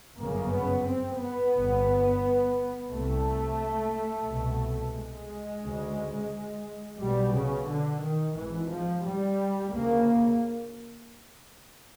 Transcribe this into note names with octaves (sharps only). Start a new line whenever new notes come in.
G1 F#2 C#3 A#3
B3
C4
B3
G1 G2
C2 C3 A3
C2 B2
G#3
D2 C#3
B1 B2 G3
C#3
D3
D#3
G#1 G#2 E3
F3
G3
D2 C#3 A#3